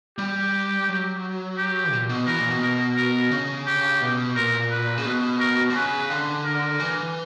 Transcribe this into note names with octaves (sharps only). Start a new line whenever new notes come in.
G3 G4
F#3
G4
A#2
B2
E3 A#4
A#2
B2
A#4
A#4
C#3
G4
B2
A#2 A#4
B4
C#3
B2
A#4
D3
C#3 B4
D3
A#4
E3